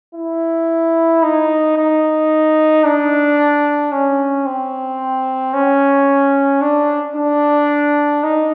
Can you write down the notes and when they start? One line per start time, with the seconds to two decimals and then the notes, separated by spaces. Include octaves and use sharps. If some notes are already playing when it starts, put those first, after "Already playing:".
0.15 E4
1.23 D#4
1.77 D#4
2.85 D4
3.92 C#4
4.46 C4
5.54 C#4
6.62 D4
7.16 D4
8.23 D#4